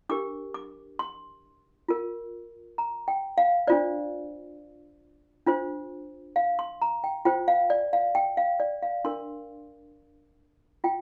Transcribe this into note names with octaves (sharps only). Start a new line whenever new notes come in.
D4 G4 A#4 D6
D6
C6
F4 A#4
A#5
G5
F5
D4 F4 C5 D5
D4 F4 C5
F5
C6
A#5
G5
F4 C5 G5
F5
D5
F5
G5
F5
D5
F5
D4 A#4 C6
F4 G5